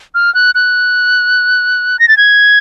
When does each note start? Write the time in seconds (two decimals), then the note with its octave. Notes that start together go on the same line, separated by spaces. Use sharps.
0.15 F6
0.35 F#6
0.55 F#6
1.99 A#6
2.08 A6
2.17 G#6